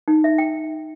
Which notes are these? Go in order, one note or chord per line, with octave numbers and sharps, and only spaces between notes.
D#4
E5
G5